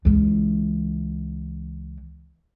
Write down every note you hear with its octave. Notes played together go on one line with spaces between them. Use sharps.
C#2 E3